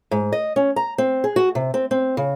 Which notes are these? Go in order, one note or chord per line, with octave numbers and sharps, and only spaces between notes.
G#2
D#5
C#4
A#5
C4
G#4
F#4
C3
C4
C4
C#3